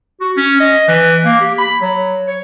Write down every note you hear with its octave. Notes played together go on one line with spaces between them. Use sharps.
F#4
C#4
D#5
E3
A#3
G4
B5
F#3
C#5